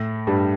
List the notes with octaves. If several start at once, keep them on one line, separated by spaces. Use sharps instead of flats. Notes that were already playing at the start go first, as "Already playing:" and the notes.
Already playing: A2 A3
G2 G3